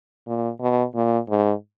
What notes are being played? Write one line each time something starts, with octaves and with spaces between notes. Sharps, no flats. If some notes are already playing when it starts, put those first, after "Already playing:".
A#2
B2
A#2
G#2